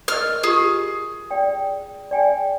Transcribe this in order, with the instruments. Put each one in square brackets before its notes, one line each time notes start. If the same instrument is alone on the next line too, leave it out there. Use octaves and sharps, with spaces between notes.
[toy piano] A#4 D#5 [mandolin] F6
[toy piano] F4 G4 [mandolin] G#4
[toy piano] D5 G5
D5 G5 G#5